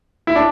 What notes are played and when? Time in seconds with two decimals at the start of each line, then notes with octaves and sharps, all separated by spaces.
0.27 E4
0.36 D4